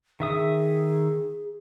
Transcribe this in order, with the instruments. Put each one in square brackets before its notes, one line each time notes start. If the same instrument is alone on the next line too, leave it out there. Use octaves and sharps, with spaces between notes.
[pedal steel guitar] D#3 E5 D#6 [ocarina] G#4